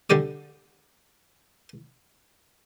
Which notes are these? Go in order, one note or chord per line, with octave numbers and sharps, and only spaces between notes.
D3 G3 G4 D5 D#6